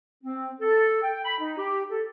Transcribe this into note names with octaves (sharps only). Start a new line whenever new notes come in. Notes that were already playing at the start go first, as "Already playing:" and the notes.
C4
A4
G5
B5
D#4
G4
A4